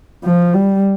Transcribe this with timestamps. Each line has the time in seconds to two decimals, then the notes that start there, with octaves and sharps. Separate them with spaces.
0.24 F3
0.54 G3